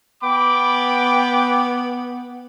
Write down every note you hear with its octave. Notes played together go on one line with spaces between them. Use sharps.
B3 G5 B5 D6